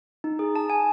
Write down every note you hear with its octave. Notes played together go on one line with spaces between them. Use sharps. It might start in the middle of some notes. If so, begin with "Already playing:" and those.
D#4
G#4
A5
G#5